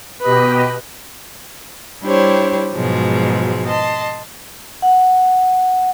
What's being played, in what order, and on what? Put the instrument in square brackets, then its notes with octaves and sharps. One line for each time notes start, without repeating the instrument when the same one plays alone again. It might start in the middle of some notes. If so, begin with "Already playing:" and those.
[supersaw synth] B2 G4 D#5 [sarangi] B4
[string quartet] G3 D4 E4 G4 C5 C#5
G#2 B2 F3 F#3 G#3
D#5 A5 C6
[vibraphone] F#5